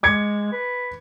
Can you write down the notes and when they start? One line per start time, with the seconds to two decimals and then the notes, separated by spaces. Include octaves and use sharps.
0.03 G#3 D6 G#6 C#7
0.52 B4